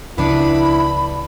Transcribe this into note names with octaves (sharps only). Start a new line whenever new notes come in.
C#2 C#3 F3 B3 D4 E4 B5